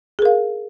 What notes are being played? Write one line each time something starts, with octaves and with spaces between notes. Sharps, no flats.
G#4 A#4 F5